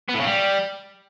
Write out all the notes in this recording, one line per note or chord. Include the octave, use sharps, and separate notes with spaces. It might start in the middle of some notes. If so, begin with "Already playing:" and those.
B3
A2
C#3
G3